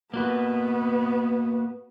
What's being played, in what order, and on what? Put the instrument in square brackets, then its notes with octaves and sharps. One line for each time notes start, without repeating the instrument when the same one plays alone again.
[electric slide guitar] A#3 F#4 B4 [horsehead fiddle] B3